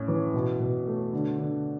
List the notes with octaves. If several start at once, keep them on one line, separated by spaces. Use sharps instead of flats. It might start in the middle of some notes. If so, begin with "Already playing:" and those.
Already playing: A2 C#4
E3
B2
B2
A3
D3
D3